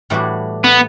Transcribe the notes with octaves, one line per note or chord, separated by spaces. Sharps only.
A2 E3 G3 D4 F#4
B3